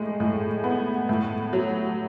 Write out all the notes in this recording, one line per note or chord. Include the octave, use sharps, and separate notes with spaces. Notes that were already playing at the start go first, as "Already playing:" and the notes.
Already playing: A2 G#3
A2
B3
A2
F#3